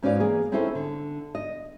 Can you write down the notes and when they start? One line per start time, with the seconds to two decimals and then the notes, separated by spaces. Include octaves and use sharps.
0.03 G#2 C#4 F#4 B4 D5 F5
0.20 E3 A#3 G#4
0.52 C4 C#4 D#4 E4 A4 C5
0.75 D3
1.35 D#5